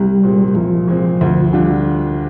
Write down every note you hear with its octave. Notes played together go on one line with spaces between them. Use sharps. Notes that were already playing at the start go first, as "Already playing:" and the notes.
Already playing: C2 G3
A#2 G#3 C4
G3
C2 F3
A#2 G#3 C4
D2
D3 G3 D4 F4